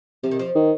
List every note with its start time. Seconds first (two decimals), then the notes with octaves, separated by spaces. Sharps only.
0.23 C3 F3
0.31 D#3
0.39 F3
0.55 D#3